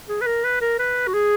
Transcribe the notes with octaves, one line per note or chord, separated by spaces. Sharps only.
G#4
B4
A#4
B4
A#4
B4
F#4
G#4